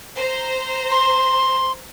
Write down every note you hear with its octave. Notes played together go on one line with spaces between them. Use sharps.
C5 A#5
C6